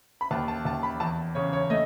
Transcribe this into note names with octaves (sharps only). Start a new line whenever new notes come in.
B5
D#2 A5
A5
D#2 A5
B5
E2 A5
C#3 C#5
C#5
A3 D#5